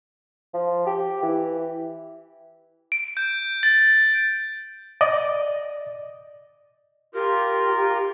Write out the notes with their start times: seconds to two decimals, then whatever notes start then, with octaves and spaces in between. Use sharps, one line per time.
0.54 F3
0.87 G4
1.23 E3
2.92 D7
3.17 G6
3.63 A6
5.01 D5 D#5
7.15 F4 G4 A#4